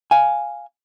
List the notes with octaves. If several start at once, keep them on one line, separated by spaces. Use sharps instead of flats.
F5 G#5